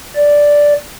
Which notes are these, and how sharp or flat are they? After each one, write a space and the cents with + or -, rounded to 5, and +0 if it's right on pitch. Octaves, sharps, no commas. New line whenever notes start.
D5 -5